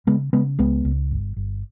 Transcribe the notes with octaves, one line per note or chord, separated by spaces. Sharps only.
C#3 G#3 B3
C#3 G#3 B3
C#2 G#3 B3
C#2
G1
G1